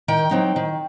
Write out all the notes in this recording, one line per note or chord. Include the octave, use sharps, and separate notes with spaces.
D#3 G5
F#3 C4 D#4
D#3